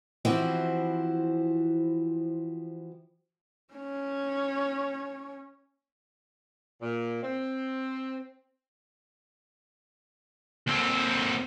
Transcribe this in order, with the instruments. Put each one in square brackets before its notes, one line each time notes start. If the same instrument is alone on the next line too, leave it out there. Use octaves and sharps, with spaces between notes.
[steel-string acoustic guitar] E3 F3 C4 E4 F#4
[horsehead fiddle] C#4 C#5
[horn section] A#2
C4
[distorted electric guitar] D#2 C4